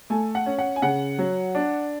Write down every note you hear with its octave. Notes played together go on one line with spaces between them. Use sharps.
A3 G#5
F#5
C#4
F#5
G#5
C#3 F#5
F#3
D4